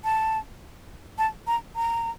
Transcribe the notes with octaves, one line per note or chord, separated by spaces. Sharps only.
A5
A5
A#5
A#5